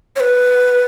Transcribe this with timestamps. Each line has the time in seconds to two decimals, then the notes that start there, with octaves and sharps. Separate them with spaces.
0.16 C#5
0.20 B4